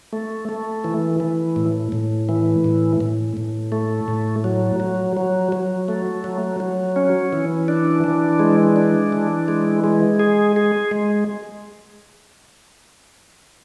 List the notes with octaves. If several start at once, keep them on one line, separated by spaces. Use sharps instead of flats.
A3
A3
E3
E3
A2
A2
E3
A2
A2
A2
A3
A2
F#3
F#3
F#3
F#3
A3
F#3
F#3
C#4
E3
D4
E3
G#3
D4
E3
G#3
G#3
G#4
G#4
G#3